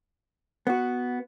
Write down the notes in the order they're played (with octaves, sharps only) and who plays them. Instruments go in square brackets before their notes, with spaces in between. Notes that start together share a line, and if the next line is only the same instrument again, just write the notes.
[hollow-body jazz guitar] B3 F#4